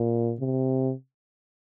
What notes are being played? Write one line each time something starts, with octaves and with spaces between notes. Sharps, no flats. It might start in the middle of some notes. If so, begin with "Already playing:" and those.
Already playing: A#2
C3